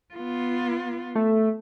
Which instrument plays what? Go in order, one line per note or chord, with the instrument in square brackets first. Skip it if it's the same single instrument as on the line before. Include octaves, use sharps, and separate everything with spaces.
[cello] B3 F4
[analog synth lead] A3